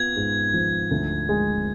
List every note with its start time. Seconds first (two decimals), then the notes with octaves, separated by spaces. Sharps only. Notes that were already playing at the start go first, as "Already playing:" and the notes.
Already playing: B3 F4 G#6
0.16 G#2
0.54 F3
0.91 D2
1.29 G#3